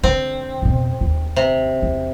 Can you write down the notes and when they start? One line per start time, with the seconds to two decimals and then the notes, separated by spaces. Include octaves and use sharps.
0.04 D3 C4
0.62 F2 B2
1.01 D#2
1.36 C3
1.82 E2